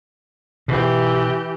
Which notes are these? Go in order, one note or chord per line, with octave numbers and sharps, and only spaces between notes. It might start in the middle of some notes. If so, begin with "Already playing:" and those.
B2 E3 G4